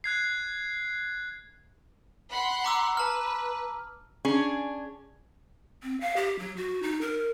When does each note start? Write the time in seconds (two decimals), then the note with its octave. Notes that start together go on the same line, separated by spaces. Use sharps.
0.04 F#6 G#6 C7
2.31 F#5 B5 C6
2.64 A#5 D6 E6
2.97 B4 A5 F6
4.25 C#4 D4 G#4
5.83 C4
6.01 F5
6.16 G4
6.39 F#3
6.57 F#4
6.83 D#4
7.01 A#4